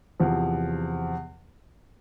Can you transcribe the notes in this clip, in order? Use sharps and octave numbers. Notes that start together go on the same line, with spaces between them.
E2 C3 F3